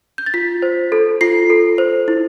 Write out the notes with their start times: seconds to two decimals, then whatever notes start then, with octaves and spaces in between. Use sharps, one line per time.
0.18 G6
0.26 A6
0.34 F4 B6
0.62 C5
0.92 A4
1.21 F4 C7
1.50 A4
1.78 C5
2.08 E4